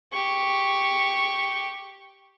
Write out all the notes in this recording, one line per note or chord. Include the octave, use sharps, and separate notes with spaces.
G4 C#6